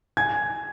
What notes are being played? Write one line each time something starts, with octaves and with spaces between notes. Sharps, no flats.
G#5 G#6